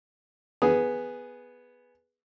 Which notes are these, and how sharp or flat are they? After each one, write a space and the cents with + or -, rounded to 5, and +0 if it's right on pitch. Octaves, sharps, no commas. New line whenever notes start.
B3 +0 G#4 +0